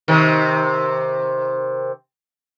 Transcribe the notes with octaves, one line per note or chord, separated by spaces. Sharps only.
C3 D#3